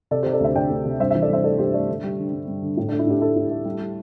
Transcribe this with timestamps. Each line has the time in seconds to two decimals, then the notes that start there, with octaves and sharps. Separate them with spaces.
0.11 C3 A4 D5
0.23 C3 G4 C5
0.33 A4 D5
0.40 D2 C5 E5
0.56 D2 D5 G5
0.70 D2
0.86 C3
1.00 G2 C5 E5
1.11 E3 C5 E5
1.22 A4 D5
1.29 G2 C5 E5
1.44 A3 A4 D5
1.59 G2 G4 C5
1.74 A3 A4 D5
1.88 D3
2.03 G3
2.18 D3
2.33 G2
2.48 G2
2.62 D3
2.77 A2
2.88 A3 D4
2.99 E4
3.07 A2 D4 G4
3.21 A3 E4 A4
3.36 A2
3.51 A3
3.65 G3
3.80 G3